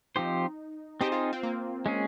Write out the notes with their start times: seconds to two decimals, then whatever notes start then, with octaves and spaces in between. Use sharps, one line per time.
0.15 F3 C4 D#4 G4 C5
1.01 C4 D#4 G4 G#4 C5
1.12 F4
1.33 C4
1.43 A#3
1.86 G#3 C#4 G#4